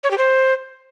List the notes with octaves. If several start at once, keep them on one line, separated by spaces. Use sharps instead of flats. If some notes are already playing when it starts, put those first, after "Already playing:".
C#5
G4
C5